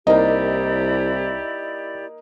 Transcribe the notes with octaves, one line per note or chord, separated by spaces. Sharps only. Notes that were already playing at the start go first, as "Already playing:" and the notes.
C2 A#3 D#4 E4 G4 D5 D#5